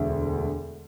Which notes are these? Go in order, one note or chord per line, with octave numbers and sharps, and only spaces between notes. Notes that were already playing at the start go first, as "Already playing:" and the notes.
Already playing: E1 D2 D3